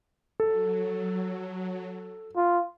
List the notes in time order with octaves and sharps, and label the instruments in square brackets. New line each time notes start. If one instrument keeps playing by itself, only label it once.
[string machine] F#3 [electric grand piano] A4
[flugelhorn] F4